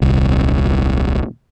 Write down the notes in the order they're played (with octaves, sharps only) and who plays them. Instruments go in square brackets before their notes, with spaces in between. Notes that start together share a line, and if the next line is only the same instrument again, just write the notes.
[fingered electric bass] D#1 C2